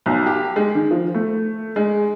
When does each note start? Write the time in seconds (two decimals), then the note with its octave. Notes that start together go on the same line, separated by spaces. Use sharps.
0.06 B1
0.26 G4
0.56 G#3
0.75 D#3
0.91 F3
1.15 A3
1.76 G#3